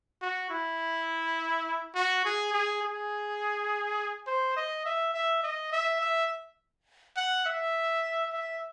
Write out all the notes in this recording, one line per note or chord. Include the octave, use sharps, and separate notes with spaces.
F#4
E4
F#4
G#4
G#4
G#4
C5
D#5
E5
E5
D#5
E5
E5
F#5
E5
E5